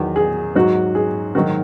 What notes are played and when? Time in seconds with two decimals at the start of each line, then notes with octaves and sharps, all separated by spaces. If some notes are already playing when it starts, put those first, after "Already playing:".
Already playing: E2 D#3 F#3
0.16 G#4
0.55 G#2 F#3 F#4
0.95 G#4
1.35 G#2 D#3 F#3 F#4